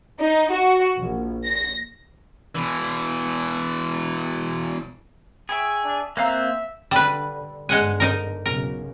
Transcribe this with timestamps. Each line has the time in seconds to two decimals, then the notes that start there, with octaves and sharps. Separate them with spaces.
0.19 D#4
0.50 F#4
0.97 A#1
1.45 A#6
2.55 B2 E3
5.49 G#4 E5 G5 C#6
5.84 D4
6.17 A#3 C4 E5 F5 A#5 F#6
6.91 D3 G3 B4
7.69 G1 G#2 D3 G#3 F#5 G#5
8.00 D#4 A#4
8.46 B1 C#3 A#4